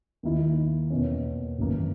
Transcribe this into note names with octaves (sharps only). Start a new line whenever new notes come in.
D#2 D#3 A#3 E4
E2 B2 A#3 C#4
G#1 F#2 E3 A#3